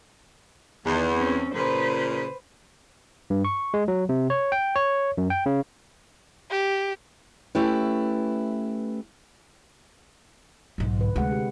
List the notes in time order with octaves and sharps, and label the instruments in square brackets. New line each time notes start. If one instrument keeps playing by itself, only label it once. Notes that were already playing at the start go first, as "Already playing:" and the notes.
[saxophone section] E2 [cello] D#3
[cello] C4 C#4
[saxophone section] A#2 C#3 [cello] B4 C5
[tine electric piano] G2
C#6
G#3
F#3
C3
C#5
G5
C#5
F#2
G5
C#3
[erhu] G4
[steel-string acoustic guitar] A3 C#4 E4 G4 B4
[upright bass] B1 G#2
[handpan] D3 B4
[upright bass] D2 [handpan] C3 G#3 F#5
[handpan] G4